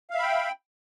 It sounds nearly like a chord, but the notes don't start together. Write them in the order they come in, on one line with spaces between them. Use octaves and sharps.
F5 E5 B5 G5